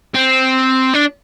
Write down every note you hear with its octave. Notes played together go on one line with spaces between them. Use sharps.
C4
D4